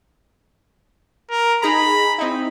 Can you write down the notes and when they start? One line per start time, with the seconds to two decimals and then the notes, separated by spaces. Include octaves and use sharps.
1.30 A#4
1.62 D#4 G#4 A#5 B5
2.18 C4 D#4 E4